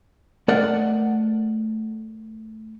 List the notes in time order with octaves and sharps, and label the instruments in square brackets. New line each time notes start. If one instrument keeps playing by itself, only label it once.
[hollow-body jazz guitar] A3 A#4 D5 D#5 F#5